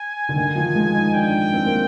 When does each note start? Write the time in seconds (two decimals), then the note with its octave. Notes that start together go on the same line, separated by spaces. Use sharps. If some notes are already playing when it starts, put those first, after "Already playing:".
Already playing: G#5
0.29 D3
0.36 D#3
0.55 F3
0.75 G#3
0.95 D#4
1.14 D4 G5
1.54 C4
1.65 A#3